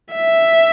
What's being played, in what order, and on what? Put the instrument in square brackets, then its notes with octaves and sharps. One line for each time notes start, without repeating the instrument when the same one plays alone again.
[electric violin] E5